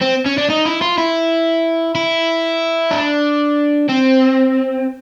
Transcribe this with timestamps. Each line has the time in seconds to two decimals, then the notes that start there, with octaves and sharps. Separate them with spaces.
0.01 C4
0.26 C#4
0.38 D4
0.50 D#4
0.66 E4
0.82 F4
0.98 E4
1.95 E4
2.91 D4
3.89 C4